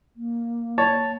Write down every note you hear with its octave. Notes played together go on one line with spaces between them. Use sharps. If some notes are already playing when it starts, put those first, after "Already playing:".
A#3
C#5 A5 A6